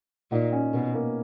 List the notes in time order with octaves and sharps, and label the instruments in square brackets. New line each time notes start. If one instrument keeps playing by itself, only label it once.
[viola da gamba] A#2 [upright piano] D#4
[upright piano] C#4
[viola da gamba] B2 [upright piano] B3
[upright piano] A#3